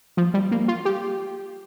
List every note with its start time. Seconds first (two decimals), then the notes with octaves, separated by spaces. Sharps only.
0.17 F3
0.34 G3
0.51 A#3
0.68 F4
0.85 G4